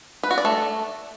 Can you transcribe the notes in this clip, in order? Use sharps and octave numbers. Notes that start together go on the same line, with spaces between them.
B4
F#4
D5
A3